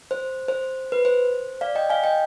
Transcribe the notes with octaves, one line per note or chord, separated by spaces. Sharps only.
C5
C5
B4
C5
D5 F5
D#5 G5
F5 G#5
D#5 G5